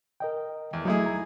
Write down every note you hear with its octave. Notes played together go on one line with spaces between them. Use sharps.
A#4 D#5 G5
E2
F#3 A3 D#4 E4 G#4
A#5